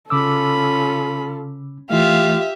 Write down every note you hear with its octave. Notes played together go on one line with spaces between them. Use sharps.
C#3 C#4 F4 A4 B5 D6 E6
E3 A3 F4 G4 E5 F5